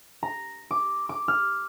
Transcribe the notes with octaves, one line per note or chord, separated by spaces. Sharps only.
A#5
D6
D6
F6